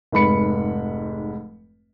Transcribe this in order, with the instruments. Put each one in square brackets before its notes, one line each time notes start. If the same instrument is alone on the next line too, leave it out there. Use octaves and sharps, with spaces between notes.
[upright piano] F1 G#2 B5 C#7